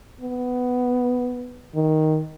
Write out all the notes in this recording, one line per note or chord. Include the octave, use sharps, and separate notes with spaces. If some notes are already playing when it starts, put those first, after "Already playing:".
B3
D#3